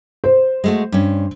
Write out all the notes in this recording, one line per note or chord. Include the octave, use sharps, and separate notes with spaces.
C5
G#3 A3 F#4
G2 C#4